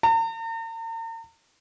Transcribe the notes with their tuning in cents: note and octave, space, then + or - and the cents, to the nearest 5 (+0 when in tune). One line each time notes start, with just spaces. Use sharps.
A#5 -45